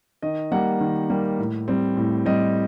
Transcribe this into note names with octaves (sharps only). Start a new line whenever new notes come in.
D#3 D#5
G3 A#3 F#5
D#3
G3 A#3
A2
G3 C4
A2
G3 C4 D#5